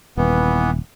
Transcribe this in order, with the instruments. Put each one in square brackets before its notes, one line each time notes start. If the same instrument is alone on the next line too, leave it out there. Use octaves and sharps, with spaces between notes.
[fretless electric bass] D#1 [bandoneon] E3 B3